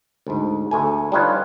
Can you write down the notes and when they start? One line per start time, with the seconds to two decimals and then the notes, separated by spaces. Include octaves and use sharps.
0.27 D2 G#2
0.71 D2 A3 G#5
1.12 G3 D4 D#4 F4 B4 C#5